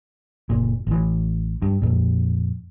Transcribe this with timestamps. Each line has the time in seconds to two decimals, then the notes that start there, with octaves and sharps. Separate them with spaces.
0.50 F#1 A#2
0.87 A1 E3
1.62 G2
1.82 F2 A#2